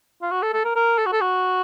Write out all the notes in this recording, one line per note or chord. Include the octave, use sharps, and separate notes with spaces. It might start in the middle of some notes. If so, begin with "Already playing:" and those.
F4
F#4
A4
A4
A#4
A#4
A4
F#4
A4
F#4